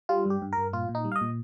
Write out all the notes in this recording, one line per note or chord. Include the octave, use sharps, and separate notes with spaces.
G3 F4
G2 G4
G2
G2 A#4
A#2 F4
A#2
D#4
G3
F5
D#5
A#2